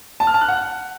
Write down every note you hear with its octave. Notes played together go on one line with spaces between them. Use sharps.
A5
F6
A5
F#6
F#5